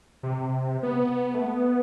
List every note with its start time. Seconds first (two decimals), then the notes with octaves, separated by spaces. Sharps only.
0.23 C3
0.83 B3
1.34 A3
1.43 B3